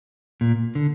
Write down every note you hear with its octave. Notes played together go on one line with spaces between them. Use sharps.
A#2
D3